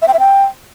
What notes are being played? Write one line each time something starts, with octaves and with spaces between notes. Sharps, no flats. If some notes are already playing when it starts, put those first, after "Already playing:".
E5
G5
E5
G5